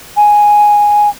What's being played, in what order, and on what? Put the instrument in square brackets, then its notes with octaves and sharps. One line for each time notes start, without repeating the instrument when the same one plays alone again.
[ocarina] G#5